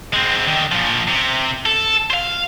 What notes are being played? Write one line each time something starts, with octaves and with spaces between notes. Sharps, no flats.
G#3 C4
D3 D#3
A#2 F3
C3
A4
C5 F5